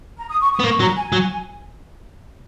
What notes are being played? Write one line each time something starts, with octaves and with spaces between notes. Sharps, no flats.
A#5
D#6
C#6
D#6
B3
A#3 C#6
F#3 A#5
G#5
F#3